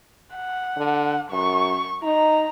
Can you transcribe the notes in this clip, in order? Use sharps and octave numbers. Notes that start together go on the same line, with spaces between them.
F#5
D3
F#2 C#6
D#4 A#5